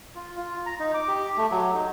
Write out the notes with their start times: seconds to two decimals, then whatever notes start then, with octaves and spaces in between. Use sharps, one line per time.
0.15 F4
0.38 F4
0.66 A#5
0.79 D#4
0.94 D6
1.08 G4
1.37 A3
1.51 F#3
1.74 D#4